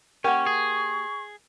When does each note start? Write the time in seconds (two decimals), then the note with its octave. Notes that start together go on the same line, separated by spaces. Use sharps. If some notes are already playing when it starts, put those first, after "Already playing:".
0.24 A#3 C#4 G4 A#4 F#5 C#6
0.46 G#4